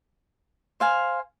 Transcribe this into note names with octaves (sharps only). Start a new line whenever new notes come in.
C5 F5 G#5